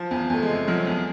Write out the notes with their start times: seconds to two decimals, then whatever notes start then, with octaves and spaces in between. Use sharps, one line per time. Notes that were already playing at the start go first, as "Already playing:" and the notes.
Already playing: F3
0.11 E2
0.16 F3
0.30 E2 A3
0.43 G#3
0.49 C3
0.68 F3 F#3
0.87 E2